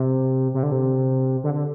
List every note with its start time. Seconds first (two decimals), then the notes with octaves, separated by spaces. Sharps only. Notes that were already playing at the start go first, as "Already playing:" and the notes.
Already playing: C3
0.54 C3
0.63 D3
0.72 C3
1.44 D3
1.54 D3